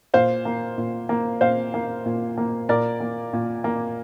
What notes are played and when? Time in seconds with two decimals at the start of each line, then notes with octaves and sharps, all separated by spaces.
0.14 A#2 C5 F5
0.45 A#3
0.78 A#2
1.09 A#3
1.41 A#2 C5 F5
1.74 A#3
2.06 A#2
2.38 A#3
2.69 A#2 A#4 D5
3.00 A#3
3.33 A#2
3.64 A#3